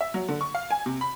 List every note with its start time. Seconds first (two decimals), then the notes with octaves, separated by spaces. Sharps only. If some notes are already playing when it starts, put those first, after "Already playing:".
0.01 E5
0.14 F#3
0.29 D3
0.41 C#6
0.55 F5
0.71 G#5
0.86 C3
1.01 B5